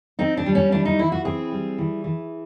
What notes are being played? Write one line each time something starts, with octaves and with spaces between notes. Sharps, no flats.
C4 D#4
D4
G3
C#4
E3 D4
D#4
E3 E4
F#4
C4 G#4
G3
E3
E3